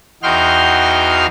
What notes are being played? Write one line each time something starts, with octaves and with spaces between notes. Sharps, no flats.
E2 D#4 F#4 G5 C6 F6